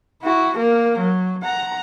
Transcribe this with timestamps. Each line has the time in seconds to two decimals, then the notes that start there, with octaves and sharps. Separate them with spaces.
0.22 E4 F#4
0.57 A#3 A#4
0.99 F#3
1.43 F#5 A#5